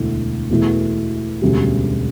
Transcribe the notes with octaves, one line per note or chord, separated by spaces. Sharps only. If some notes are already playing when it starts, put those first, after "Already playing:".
Already playing: E1 D2 D3 A3 E4
E2 B2 A3 E4
E1 D2 C#3 G3